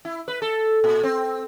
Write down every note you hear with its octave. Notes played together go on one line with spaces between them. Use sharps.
E4
B4
A4
A#2
C4